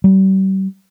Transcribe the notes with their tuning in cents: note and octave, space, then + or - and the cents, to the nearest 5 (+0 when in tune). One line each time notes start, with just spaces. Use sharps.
G3 -40